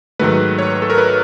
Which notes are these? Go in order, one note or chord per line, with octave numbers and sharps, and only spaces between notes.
G#2 D#3 F#3 A3 B4
C#5
A4
A#4
B4